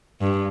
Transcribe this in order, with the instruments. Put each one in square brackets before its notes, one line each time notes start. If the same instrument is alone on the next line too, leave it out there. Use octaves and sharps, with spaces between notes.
[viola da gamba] G2